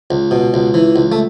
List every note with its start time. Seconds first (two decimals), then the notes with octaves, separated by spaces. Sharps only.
0.11 C#2
0.31 B2
0.54 C#2
0.74 E3
0.96 C#2
1.12 A3